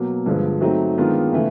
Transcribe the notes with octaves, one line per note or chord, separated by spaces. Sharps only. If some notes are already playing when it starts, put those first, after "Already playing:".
Already playing: B2 F#3 A#3
G2 D3 F3 G#3
F#3 A3 C4 D#4
D#3 G#3 B3 D4 F4
C#3 E3 A3